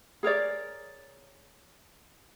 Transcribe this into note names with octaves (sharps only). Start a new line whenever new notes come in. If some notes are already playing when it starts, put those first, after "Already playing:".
G#4 A#4 C#5 D5